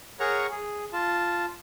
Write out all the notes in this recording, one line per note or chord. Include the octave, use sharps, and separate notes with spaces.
G#4 A#4 C#5 F#5 A#5 C#6
G#4
F4 A5